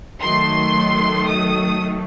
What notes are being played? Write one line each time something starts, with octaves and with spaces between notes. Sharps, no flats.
D#3 F#3 A3 C6
D#6